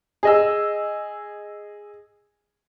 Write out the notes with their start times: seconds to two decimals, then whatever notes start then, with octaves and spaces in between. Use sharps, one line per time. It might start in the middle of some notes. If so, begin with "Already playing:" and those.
0.23 G#4 D#5 E6